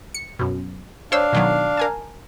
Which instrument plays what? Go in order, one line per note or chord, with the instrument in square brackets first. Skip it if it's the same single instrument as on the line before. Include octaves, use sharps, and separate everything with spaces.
[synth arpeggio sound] C#7
F#2 B2
[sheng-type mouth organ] D4 F5 [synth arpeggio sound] C5 C#5 E6
[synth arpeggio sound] B2 D#3 F#3
A#4 G#5 A5